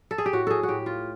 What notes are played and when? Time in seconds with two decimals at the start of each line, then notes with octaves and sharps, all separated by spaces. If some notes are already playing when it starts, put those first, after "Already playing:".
0.11 A4
0.18 G#4
0.26 G4
0.33 A2 F#4
0.47 G#4 A4
0.63 F#4
0.68 A2 G4
0.86 F4